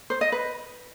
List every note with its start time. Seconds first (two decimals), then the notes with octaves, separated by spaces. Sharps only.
0.10 C5
0.21 D#5
0.32 B4